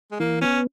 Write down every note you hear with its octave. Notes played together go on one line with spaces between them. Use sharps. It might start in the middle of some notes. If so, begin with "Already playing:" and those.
G#3
E3 A#3
B3 C#4